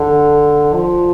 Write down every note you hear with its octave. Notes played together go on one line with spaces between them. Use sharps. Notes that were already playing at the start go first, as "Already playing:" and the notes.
Already playing: D3
F3